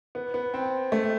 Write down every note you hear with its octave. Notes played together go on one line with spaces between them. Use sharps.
B3
B3
C4
A3